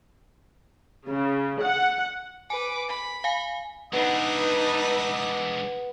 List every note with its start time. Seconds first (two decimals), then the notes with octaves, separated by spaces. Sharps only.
1.08 C#3
1.62 F#5
2.50 B4 G#5 D6
2.89 B5
3.24 F5 G#5
3.93 G#3 B3 D4 D#4 B4 D#5 E5 D#6